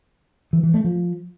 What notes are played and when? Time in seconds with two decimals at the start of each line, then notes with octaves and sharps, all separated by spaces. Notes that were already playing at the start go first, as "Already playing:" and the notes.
0.53 E3
0.63 E3
0.74 A3
0.84 F3